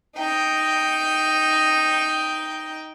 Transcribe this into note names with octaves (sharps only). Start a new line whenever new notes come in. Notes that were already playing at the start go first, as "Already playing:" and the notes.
D#4 G5